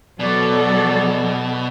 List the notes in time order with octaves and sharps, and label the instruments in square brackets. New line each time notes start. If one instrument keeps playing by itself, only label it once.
[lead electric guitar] B2 [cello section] F#3 A4 [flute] D5